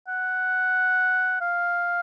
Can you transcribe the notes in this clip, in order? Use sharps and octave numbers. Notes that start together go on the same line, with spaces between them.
F#5
F5